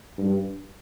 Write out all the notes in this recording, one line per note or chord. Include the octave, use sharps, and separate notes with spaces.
G2